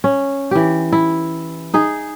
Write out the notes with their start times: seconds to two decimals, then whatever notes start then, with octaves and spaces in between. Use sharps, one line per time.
0.04 C#4
0.51 E3 G4
0.92 E4
1.74 D#4 G#4